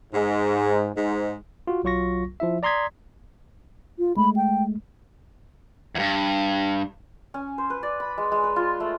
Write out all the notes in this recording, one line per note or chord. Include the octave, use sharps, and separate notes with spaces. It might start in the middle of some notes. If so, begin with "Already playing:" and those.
G#2
G#2
F4 F#4
B1 F#3 F4 C#6 A#6
F3 E4 E5
D5 A#5 C6 D#6 G#6 B6
F4
G#3 A3 B5
G5
E2 G2
C#4
C5
B4
D5
B5
G#3
G#3
B4
F4
A3